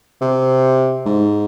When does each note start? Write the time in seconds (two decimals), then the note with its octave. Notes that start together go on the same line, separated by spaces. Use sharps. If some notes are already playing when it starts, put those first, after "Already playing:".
0.21 C3
1.06 G#2